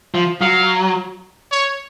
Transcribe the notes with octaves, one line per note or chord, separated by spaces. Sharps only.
F3
F#3 F5
C#5